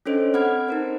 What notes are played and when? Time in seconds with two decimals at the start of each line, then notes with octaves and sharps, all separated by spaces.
0.06 C#4 D4 A4 C5 C#5 D#5
0.34 C4 F#5 B5 F6 G#6
0.68 D#4 A#4 C5